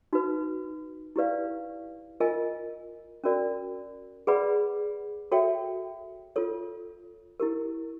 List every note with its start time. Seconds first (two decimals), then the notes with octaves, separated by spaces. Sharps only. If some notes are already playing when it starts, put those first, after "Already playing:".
0.13 D#4 F#4 B4
1.16 E4 G4 B4 D5 F5
2.20 F4 A#4 D#5 G#5
3.24 C#4 F#4 A#4 D5
4.27 G#4 B4 D5 F#5 B5
5.32 F#4 A4 C#5 E5 G5
6.36 F4 A4 C#5
7.40 E4 G4 A#4